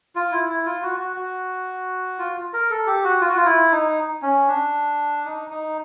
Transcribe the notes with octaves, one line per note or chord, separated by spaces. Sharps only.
F4
E4
E4
F4
F#4
F#4
F#4
F4
A#4
A4
G4
F#4
F4
F#4
F4
E4
D#4
C#4
D4
D#4
D#4